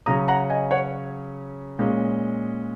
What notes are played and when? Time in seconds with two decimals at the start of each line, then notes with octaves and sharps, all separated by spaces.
0.06 C#3 F#3 C#4 A#5 D#6
0.28 F#5 A#5
0.50 D#5 G#5
0.71 C#5 F#5
1.79 A#2 G#3 C#4